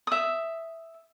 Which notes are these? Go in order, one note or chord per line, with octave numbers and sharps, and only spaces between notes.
E5 D#6